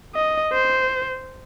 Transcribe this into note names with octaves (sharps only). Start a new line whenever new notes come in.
D#5
C5